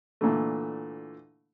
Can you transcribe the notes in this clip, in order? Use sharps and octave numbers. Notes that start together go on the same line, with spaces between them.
A#2 D3 E3 A3